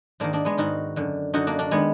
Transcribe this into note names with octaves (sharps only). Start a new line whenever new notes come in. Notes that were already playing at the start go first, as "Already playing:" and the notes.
G#2 D#3 A#3 D4
A#3 D4
G#3 B3
G#2 D#3 D#4 F#4
F#2 D3
F#2 D3 D#4 F#4
A#3 D4
A#3 D4
D#3 G#3 B3